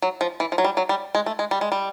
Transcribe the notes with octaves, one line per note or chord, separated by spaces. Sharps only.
F#3
F3
E3
F3
F#3
G3
F#3
G3
G#3
A3
G#3
G3
G#3
G3